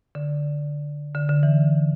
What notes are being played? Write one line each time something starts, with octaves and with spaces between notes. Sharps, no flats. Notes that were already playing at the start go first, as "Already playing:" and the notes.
D3
D3
D3
E3